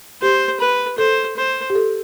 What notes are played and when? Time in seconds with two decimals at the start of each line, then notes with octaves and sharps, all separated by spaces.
0.22 G4 C5
0.60 B4
0.98 A4 C5
1.37 C5
1.70 G4
1.75 A4